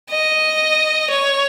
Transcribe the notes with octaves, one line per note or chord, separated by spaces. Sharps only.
D#5
C#5